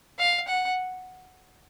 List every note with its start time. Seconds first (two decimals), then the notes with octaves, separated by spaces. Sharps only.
0.19 F5
0.48 F#5